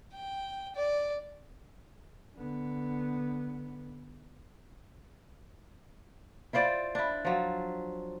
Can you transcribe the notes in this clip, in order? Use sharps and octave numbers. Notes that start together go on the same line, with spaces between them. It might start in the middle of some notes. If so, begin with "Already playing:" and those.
G5
D5
D3 B3
E4 F4 C5 D5
D4 E4
F3 F#3